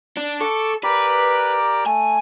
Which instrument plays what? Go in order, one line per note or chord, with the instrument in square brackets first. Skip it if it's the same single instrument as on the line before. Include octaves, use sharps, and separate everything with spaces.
[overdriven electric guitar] D4
[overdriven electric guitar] A4 [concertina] C#6 D6
[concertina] G4 A#4 D5 [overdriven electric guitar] B4
[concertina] A3 [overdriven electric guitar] G#5